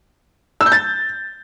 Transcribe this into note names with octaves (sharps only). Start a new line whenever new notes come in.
E6
G6
A6